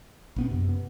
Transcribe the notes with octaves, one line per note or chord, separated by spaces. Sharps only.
A#1 B3 C4
F#2 C3
B3